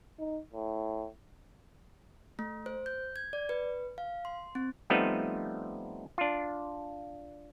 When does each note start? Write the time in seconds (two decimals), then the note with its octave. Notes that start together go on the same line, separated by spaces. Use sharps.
0.19 D#4
0.54 A2
2.39 A3
2.66 C5
2.86 G6
3.16 G#6
3.33 D5
3.49 B4
3.98 F5
4.25 C6
4.55 C4
4.90 F3 G3 A3 B3 C4 D#4
6.18 D4 F4